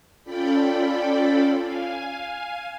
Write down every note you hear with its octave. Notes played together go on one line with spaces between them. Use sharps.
C#4 F4 A4 D5 G5 B5
F5 G#5